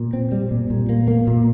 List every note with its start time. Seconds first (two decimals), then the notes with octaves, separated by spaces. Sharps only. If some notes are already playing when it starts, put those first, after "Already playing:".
Already playing: A#2
0.13 C4
0.32 G3
0.51 A#2
0.70 A#2
0.89 A#3
1.08 A#3
1.27 A#2